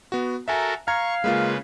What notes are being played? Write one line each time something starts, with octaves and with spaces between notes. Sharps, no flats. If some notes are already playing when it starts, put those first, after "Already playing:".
B3 F#4
F#4 A4 A#4 E5 G#5 A#5
F5 A#5 C#6 G#6
C#3 G#3 A#3 F4 B4